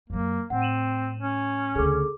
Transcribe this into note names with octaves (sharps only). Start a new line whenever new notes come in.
F#2 F#3 A#3
A2 C4 F#5
D#7 E7 F#7
C#4
D2 C#3 G#4 A4 D6